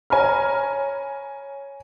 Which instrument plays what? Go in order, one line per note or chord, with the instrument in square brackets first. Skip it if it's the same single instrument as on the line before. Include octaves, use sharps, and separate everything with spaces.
[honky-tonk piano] C#5 G#5 A#5 B5 F6